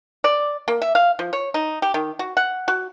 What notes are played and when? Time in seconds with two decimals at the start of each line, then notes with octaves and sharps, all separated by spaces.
0.24 D5
0.68 A#3
0.82 E5
0.95 F5
1.19 F3
1.33 C#5
1.54 D#4
1.82 G4
1.94 D#3
2.19 F#4
2.37 F#5
2.68 F#4